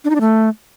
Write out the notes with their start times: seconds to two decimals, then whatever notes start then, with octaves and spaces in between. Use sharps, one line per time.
0.05 D4
0.10 D#4
0.15 D4
0.21 A3